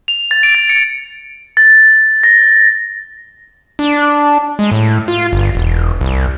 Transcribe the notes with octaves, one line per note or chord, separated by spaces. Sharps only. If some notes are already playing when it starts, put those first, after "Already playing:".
F7
A6
D7
A6
C#7
A6
A#6
D4
G#3
A2
F4
G1
E1
C2